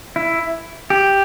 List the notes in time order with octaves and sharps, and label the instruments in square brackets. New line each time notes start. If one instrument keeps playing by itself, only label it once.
[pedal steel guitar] E4
G4